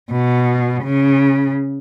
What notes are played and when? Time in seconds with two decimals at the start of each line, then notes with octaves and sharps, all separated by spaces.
0.11 B2
0.84 C#3